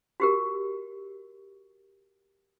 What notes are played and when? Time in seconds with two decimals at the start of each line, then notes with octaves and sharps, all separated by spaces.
0.20 F#4 G4 A#4